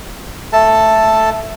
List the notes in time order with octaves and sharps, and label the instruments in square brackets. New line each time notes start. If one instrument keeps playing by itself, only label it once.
[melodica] A3 A4 A5